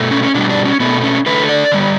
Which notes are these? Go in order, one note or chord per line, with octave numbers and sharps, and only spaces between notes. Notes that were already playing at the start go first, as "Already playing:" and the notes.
Already playing: B2 A3
C#4
C#4
B2 G3 D4
D4
C#4
B2 A3 B3
C#4
D3 A3 B4
D5
D3 G3